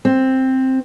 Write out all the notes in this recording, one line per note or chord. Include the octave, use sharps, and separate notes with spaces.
C4